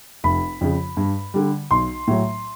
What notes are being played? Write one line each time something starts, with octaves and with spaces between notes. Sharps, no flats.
F1 B5
F2 C#3
G2
D3 G3
B1 C6
A2 F#3